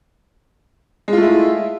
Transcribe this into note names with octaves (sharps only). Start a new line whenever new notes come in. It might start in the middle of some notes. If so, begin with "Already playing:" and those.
G#3 A3 E4 F4